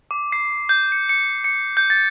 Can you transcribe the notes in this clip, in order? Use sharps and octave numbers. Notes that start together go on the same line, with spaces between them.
D6
C7
G6
C#7
C#7
C#7
G6
A6